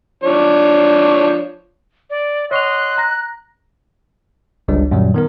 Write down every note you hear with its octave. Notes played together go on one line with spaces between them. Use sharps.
F3 D4 C#5
D5
C#5 D#5 F#5 C6 C#6 F#6 F7
A#5 A#6
G1 C#2 G3 D4
F#2 A#2 D#3 F#3 G3
D#3 B3 A#4